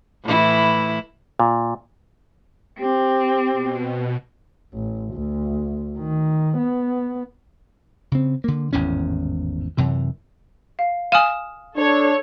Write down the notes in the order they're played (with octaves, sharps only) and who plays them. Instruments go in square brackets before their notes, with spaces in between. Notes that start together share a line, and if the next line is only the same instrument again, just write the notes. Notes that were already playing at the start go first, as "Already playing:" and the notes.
[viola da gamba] A2 E3 E4
[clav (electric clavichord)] A#2
[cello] C4 [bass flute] G4
[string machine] B2
[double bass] A1
D2
D#3
B3
[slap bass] C#3 C4
D3 A#3
G#1 E2 A2 C#4
F#2 C3 E3
[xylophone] F5
[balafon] F5 G#5 [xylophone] D#6 F6 E7
[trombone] D4 [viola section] A4 C#5